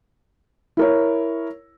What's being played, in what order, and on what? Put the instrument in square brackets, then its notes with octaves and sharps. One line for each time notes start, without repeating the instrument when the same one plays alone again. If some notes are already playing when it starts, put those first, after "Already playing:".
[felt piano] E4 A#4 C#5